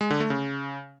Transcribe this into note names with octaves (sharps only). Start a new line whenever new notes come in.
G#3
D3
A3
C#3